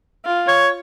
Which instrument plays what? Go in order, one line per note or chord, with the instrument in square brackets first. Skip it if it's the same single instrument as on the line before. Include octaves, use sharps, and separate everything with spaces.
[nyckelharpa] F4
[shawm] C#5